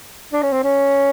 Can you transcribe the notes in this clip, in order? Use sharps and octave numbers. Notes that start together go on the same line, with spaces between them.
D4
C#4
C4
C#4